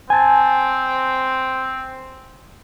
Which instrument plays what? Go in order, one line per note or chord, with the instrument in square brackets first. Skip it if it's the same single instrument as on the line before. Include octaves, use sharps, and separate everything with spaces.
[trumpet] C4 [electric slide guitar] G#5 A5